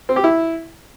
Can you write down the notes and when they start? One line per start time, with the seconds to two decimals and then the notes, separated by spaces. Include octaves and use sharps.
0.09 C4
0.16 G4
0.24 E4